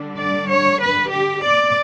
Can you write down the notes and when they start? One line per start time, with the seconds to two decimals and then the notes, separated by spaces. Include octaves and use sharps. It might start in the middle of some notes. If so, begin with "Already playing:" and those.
Already playing: D3 G3 D4
0.19 D5
0.50 C#5
0.80 B4
1.11 G4
1.43 D5